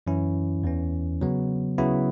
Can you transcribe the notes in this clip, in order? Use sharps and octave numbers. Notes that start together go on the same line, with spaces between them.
F#2 E3 C#4 E4
E2 E3 C#4
C#3 F#3 B3
C#3 F#3 B3 E4